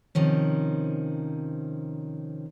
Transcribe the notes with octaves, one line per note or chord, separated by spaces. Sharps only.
C3 D#3 F3 C#4